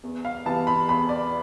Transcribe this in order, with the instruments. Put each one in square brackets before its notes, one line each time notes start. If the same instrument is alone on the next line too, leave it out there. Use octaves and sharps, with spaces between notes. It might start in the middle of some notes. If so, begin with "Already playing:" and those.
[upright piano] E2
F5
C3 E3 B3 A5
B5
E2 B5
D5